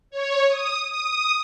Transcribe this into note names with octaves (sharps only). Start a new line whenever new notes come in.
C#5
D#6
D#6